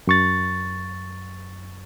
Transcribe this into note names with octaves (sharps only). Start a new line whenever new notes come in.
F#2 C#6 A6